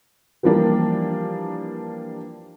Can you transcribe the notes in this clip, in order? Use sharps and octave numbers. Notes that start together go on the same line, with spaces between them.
E3 F3 G3 A#3 D4 G4